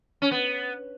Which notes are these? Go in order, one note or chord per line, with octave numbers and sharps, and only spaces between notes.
C#4
B3